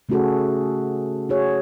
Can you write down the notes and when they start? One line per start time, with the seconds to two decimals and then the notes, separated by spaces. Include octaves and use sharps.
0.09 C#3 A3 C#4 F#4 G#4 A4
1.29 F#4 G#4 C#5